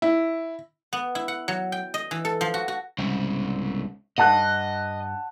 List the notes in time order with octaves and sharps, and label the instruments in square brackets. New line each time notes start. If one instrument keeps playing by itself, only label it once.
[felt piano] E4
[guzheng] B3
E4
F#5
F#3
G5
D#5
E3
A4
F3
F#4
F#4
[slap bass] C2 [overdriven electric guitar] G#2 C#3
[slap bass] G2 [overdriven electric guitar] D#5 [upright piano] F#5 A5 F#6